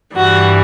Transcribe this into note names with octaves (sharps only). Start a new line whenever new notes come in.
G2 E3 G3 F#4